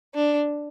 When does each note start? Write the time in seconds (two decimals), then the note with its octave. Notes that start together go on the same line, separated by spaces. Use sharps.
0.15 D4